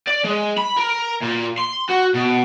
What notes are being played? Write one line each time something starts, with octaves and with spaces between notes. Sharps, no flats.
D5
G#3
B5
A#4
A#2
C6
F#4
B2